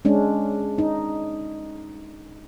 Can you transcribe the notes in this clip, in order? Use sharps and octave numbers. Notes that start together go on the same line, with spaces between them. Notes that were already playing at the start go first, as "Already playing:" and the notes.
G#3 C#4 D4
D#4